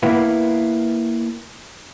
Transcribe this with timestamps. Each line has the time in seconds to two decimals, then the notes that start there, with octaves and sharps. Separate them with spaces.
0.03 A#3 B3 E4 B4